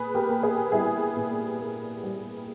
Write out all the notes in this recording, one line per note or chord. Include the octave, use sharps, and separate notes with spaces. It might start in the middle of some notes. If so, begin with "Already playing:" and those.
Already playing: A#2 G#4 B4
G4 A#4
A#3
G#4 B4
G3 E4 G#4
A#2
A#3
G3